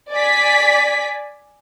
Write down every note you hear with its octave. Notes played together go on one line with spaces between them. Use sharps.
D5 G#5 B6